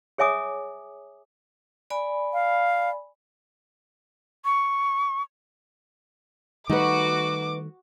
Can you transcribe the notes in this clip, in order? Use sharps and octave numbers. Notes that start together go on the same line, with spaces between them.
G#4 C#5 E5 G#5 D6 D#6
D5 G#5 B5
F5
C#6
D#3 G3 A3 D#4 F#4 B4 D6